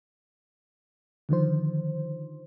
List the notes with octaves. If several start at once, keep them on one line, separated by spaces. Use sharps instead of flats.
D3 D#3 F3 C5